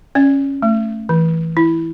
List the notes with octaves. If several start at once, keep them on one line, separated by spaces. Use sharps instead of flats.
C#4 D5
A3
E3
E4